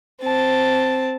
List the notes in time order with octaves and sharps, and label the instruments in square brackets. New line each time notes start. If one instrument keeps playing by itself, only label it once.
[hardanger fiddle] C4 A5